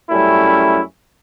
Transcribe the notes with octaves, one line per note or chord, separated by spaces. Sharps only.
F#2 G3 A3 C#4 E4